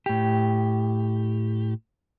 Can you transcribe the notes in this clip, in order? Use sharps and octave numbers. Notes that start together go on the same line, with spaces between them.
A2 G4